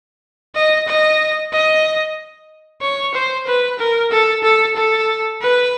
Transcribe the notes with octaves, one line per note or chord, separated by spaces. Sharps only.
D#5
D#5
D#5
C#5
C5
B4
A#4
A4
A4
A4
B4